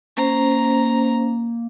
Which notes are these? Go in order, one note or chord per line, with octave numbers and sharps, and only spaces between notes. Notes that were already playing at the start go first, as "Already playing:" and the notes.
A#3 C#4 C5 A#5